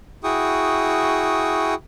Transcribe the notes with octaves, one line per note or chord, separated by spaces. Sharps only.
E4 F#4 G#4 G5 C#6 D#6